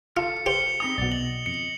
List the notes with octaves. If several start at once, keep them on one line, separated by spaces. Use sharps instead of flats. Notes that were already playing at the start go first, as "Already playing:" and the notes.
F4 A4 A5 F6 C#7
G4 C5 C#7 F7 G7
C4 D#4 G#4 D#5 B5 D#6 F7
B1 B2 D5 F#5
D#5 F#7
F2 C#7